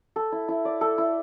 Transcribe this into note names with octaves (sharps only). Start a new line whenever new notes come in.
A4
E4
E4
D5
A4
E4